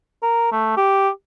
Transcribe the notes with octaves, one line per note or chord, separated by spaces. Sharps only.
A#4
A3
G4